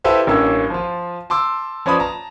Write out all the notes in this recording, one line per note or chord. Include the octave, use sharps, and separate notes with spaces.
E4 G4 A4 B4 C5 F5
A1 G2 A#3 C#4 E6
F3 F4
A5 C6 D6 E6
F3 C#4 B4 D5 B5 D#6
A5 A#5